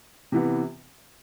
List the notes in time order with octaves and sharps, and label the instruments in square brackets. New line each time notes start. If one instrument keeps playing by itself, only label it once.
[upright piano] C3 E3 B3